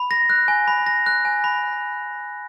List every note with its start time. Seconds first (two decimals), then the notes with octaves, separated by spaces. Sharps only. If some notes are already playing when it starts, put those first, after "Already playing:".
Already playing: B5
0.11 A#6
0.30 F#6
0.48 G#5
0.68 B5
0.86 A#6
1.06 F#6
1.25 G#5
1.44 B5